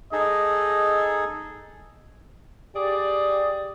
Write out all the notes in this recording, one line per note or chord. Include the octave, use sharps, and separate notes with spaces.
D#4 G#4 A4 D#5
G4 G#4 D5